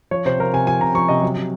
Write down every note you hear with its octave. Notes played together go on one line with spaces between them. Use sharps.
F3 C#5
C3 C5
F3 A#4
C3 G#5
F3 G#5
C3 A#5
F3 C#6
C3 D#5
F#3
C3